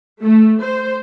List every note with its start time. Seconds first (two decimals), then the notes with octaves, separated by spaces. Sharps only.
0.22 A3
0.62 C5